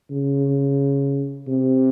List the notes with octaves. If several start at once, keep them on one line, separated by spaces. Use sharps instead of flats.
C#3
C3